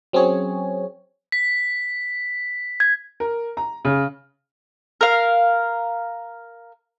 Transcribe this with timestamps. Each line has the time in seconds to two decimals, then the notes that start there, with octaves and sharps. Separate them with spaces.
0.13 F#3 C4 C#4 G#4 C#5
1.32 B6
2.80 G#6
3.20 A#4
3.57 A#5
3.85 C#3
5.01 A#4 F5